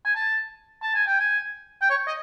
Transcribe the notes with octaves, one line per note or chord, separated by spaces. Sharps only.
G#5
A5
A5
G#5
G5
G#5
G5
C#5
D#5